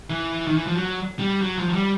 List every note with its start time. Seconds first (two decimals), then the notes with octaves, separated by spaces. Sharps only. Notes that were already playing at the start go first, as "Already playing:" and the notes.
0.10 E3
0.47 D#3
0.57 E3
0.67 F3
0.76 F#3
1.19 G3
1.42 F#3
1.58 F3
1.68 F#3
1.73 G3